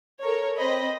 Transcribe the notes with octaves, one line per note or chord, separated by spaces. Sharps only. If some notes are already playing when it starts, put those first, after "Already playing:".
A4 A#4 C#5
C4 C5 D#5 B5